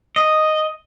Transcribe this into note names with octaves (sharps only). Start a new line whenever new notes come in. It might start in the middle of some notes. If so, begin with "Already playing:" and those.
D#5